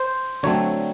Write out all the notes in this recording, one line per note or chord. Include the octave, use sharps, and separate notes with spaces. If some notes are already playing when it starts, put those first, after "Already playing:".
Already playing: C5
D3 F#3 A3 C4 C#5